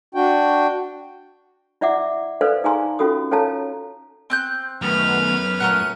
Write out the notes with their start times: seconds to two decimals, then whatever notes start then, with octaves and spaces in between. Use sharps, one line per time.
0.15 D4 F#4 G5
1.81 E4 D5 E5 F#5 D6
2.41 A4 B4 C5 D5 F5
2.64 D#4 G#4 F5 G#5 A#5 C6
2.99 C#4 F4 F#4 A4 D#6
3.31 C#4 A4 C#5 F5 A5 A#5
4.30 C4 F#6 G6
4.82 F#2 D#3 A3 B3 B4 F6
5.60 A#2 A3 C#4 A#4 F#5 D#7